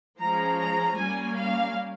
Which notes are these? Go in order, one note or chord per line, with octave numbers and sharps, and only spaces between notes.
F3 G#3 C#4 A#5
A#5
G3 A#3 C#4 G#5
F5